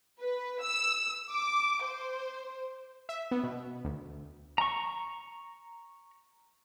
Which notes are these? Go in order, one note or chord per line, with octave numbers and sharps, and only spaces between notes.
B4
E6
D6
C5
E5
B3
B2
D2
A#5 C#6